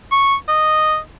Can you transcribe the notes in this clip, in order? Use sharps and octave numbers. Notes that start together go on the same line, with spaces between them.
C#6
D#5